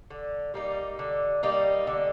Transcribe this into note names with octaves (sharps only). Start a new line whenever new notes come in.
D3
G3 A#3 D#4
D3
G3 A#3 D#4
D3